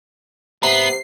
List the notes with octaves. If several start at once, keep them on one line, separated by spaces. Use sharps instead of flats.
G#2 C3 B3 E5 A#5 C7